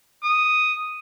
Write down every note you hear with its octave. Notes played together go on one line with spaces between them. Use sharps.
D#6